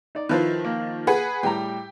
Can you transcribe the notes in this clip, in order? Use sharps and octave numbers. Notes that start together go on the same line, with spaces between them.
D#4 D5
D#3 F3 E4 B4 C5
A#3
G#4 B4 F#5
A2 G3 G4 A#5